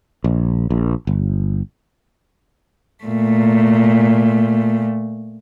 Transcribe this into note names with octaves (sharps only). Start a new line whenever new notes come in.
A#1
A#1
G1
A#2 A3